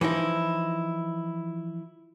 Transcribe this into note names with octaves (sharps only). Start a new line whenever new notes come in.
E3 F3 D#4 E4